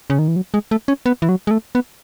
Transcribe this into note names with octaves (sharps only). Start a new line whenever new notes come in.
C#3
D#3
E3
F#3
G#3
A3
C#4
B3
E3
F#3
G#3
A3
B3